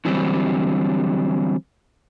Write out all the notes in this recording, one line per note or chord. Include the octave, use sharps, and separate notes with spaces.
D3 E3 F#3 G3 C4